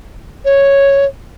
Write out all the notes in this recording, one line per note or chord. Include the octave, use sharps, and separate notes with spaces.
C#5